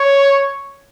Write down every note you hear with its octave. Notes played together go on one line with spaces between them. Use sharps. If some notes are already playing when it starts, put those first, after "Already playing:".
Already playing: C#5